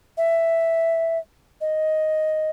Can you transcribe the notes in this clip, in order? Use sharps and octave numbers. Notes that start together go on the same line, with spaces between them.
E5
D#5